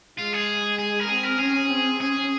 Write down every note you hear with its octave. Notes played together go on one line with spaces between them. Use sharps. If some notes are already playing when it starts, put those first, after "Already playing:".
G#3 F4
G#4
G#4
A#4
C4 G#4
A#4
C#4 G#4
C4
C#4 G#4